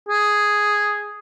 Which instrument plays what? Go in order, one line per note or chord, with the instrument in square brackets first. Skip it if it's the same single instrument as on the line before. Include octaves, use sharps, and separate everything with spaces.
[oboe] G#4